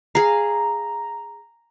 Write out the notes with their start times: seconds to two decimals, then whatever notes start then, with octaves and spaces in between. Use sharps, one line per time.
0.15 G#4 F5 A#5